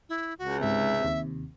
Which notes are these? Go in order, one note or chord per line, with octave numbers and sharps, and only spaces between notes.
E4
C#2 F#4
G#2 C3 E5
D#2 C3